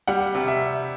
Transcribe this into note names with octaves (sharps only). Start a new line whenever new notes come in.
G3 F#5
C3
E5